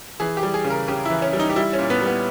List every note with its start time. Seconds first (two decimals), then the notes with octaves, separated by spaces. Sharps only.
0.20 E3 G#4
0.37 G4
0.43 G3
0.54 G#4
0.64 C#3
0.70 A#4
0.88 C#3 G4
1.05 E3 E4
1.22 C#4
1.33 G3
1.39 D#4
1.50 G4
1.56 G3 E4
1.73 C#4
1.79 A#2
1.90 B3
2.02 G3
2.07 B3